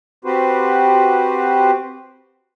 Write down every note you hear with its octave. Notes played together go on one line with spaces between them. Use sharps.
C4 F#4 G4 B4 C5